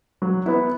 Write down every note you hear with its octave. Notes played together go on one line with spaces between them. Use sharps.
F#3
B3 E4